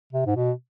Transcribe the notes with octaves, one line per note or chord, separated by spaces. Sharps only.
C3
G#2
B2